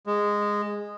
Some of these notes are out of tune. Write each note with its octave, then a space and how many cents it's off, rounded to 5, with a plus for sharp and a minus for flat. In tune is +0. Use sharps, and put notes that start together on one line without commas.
G#3 -10